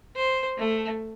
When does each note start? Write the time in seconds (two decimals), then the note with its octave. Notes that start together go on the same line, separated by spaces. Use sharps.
0.16 C5
0.58 A3